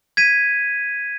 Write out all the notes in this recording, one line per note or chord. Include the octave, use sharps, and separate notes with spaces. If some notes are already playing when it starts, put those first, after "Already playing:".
G#6 B6 D#7